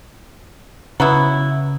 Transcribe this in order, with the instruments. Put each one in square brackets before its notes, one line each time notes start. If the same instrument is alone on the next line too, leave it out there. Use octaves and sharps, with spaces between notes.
[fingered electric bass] C#3 [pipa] F#3 B3 E4